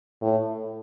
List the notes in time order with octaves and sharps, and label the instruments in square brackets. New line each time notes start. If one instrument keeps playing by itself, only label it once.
[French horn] A2